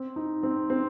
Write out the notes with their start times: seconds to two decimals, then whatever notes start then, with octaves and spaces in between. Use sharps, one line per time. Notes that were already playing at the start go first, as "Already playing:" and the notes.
Already playing: C4
0.16 D#4
0.43 C4
0.70 C4